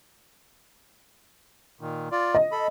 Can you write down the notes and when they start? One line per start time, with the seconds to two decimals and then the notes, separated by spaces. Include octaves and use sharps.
1.81 A#2 D#3
2.12 F4 D5
2.35 D#5
2.52 A4 B5